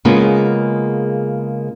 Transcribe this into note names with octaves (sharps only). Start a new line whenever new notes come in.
C#3 G#3 A#3 B3 F4